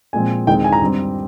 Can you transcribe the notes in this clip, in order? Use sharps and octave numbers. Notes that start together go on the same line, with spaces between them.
A#2 F3 G#3 C4 G#5
D#2 D#3 G#3 C4 G5
G#5
A#5
G2 G3 C4